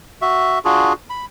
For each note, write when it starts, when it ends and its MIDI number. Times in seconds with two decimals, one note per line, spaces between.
0.22 0.59 66
0.22 0.59 76
0.65 0.93 62
0.65 0.93 65
0.65 0.93 66
0.65 0.93 68
1.10 1.25 83